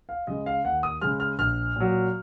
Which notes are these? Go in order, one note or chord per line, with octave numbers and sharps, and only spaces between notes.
F5
C#3 G#3 D#5
F5
D#2 F#5
D#6
C#3 G#3 F6
F6
A#1 F6
A#2 F#3